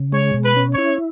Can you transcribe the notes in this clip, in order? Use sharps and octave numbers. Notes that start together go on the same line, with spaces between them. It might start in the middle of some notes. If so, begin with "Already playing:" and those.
Already playing: C#3
G#3 C#5
B2
B4
C#4
C#5
E4